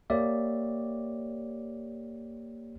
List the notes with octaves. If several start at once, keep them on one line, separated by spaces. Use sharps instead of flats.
A#3 G4 C#5 D5 E5